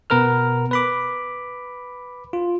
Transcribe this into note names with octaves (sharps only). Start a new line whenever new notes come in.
B2 B3 A#4 B4 F6
B4 B5 D6
F4